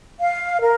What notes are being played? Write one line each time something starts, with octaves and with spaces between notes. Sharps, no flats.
F5
A#4